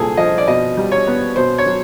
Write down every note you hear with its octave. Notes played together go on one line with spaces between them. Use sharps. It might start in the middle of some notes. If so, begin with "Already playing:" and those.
Already playing: C2 A#2 G#4 A4
F3 D#5
D5
B2 D#5
G3
C#5
B3
B2 C5
C#5
F#3